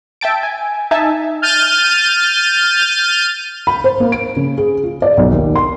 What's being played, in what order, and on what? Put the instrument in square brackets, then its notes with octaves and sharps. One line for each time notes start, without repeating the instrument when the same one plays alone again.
[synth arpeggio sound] E5 G5 A5 D7
G#5
D#4 E5 G#5 A5
[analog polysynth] F6 G6 A6 D#7
[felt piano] B5
C5
A#3
D7
C#3
G#4
F4
D5
B1
D#2
C6